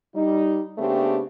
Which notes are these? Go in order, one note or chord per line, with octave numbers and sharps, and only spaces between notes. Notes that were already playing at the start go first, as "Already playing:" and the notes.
G3 D#4
C#3 A3 B3 C4 D4 G4